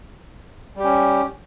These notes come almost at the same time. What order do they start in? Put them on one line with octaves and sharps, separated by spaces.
G3 G4 C#4